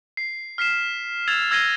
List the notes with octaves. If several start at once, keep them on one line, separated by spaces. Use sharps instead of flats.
C7
F6 B6 C7 E7
E6 G#6 A6 E7 F7
E6 G#6 A#6 C7 D#7 G7